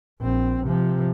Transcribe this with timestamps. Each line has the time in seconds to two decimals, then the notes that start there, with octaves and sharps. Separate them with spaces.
0.20 A#1 C4
0.64 C3 F3